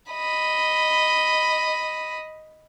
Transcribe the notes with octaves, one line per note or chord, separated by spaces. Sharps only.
D#5 B5